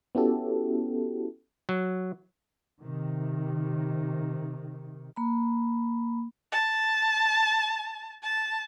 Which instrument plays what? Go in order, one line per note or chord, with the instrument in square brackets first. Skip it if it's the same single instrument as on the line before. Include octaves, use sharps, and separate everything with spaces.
[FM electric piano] B3 C#4 E4 F#4 G4 A4
[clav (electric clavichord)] F#3
[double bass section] C3 D#3
[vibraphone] A#3 B5
[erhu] A5
A5